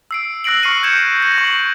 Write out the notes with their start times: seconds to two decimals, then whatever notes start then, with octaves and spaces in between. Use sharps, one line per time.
0.11 E6 C7 D7
0.44 E6 F#6 A#6 C7 D7 F#7
0.63 C#6 F6 C7 C#7 D#7 F#7
0.83 G6 G#6 C#7 E7
1.22 A#6
1.38 C#6 F#7